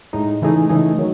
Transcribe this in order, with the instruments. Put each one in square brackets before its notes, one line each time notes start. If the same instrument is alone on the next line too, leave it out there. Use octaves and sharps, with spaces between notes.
[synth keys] A2 G#3 D#4
C#3 E3 A3 D#4 G#4
C#3 E3 A3 D#4 G#4
D#3 F#3